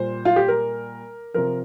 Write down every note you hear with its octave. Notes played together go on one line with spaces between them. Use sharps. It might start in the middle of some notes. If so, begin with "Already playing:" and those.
Already playing: A#2 G3 C5
F4
G4
A#4
C3 F3 A#4